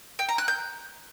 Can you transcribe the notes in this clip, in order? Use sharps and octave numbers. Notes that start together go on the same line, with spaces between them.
G5
A#5
F#6
G6